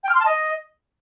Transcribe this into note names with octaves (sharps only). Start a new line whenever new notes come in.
G5
F6
C6
A5
D#5